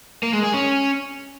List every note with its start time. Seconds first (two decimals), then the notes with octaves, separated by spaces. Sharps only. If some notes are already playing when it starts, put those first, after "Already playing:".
0.23 A#3
0.33 G#3
0.43 G#4
0.54 C#4